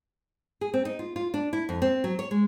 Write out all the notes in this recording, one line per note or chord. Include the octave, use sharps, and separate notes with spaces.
G#4
C4
D#4
F4
F4
D4
E4
F2
C4
F#3
C#5
G#3